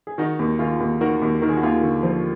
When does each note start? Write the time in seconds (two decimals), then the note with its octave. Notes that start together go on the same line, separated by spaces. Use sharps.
0.07 G#4
0.18 D#3 D#4 F#4
0.39 D#2
0.59 D#3 F4 G#4
0.80 D#2
1.01 D#3 F#4 A#4
1.22 D#2
1.42 D#3 A#4
1.49 G#4
1.57 F#4
1.63 D#2 F4 G#4
1.83 D3
2.03 F3